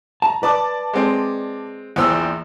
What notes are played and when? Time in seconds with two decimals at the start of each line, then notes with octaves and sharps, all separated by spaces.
0.22 A5 A#5
0.43 B4 D5 A5 D6
0.94 G#3 C4
1.96 A#1 E2 C5 G5 E6